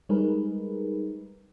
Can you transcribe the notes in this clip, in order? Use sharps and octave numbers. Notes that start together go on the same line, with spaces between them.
G3 G#3 D#4 G#4 A#4 B4